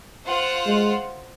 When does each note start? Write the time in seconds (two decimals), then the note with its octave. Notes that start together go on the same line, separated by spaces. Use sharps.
0.26 F4 C5 F#5
0.66 G#3